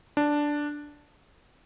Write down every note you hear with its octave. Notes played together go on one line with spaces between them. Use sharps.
D4